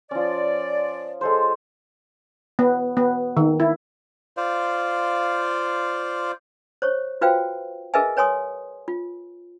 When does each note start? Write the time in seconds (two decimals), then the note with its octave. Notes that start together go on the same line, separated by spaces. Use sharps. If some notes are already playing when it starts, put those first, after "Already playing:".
0.11 F3 C#4 D5
1.21 G#3 A4 C5
2.59 B3
2.97 B3
3.37 D#3
3.60 E4
4.37 F4 C5 D5 F5
6.82 C5 C#5 C#6
7.21 F4 F#4 B4 C5 F5 G5
7.94 G#4 A#4 B4 D#5 E5 G#5
8.17 B4 C#5 G#5 C6 D#6
8.88 F4